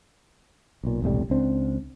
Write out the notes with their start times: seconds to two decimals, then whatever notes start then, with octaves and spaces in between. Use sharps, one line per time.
0.83 B1 A#2
1.02 E1 C2 A2 G3
1.30 C#2 C4 D4